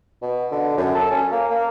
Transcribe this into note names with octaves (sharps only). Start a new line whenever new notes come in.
B2
D3
F#2
A4
C#4
A#3
A#3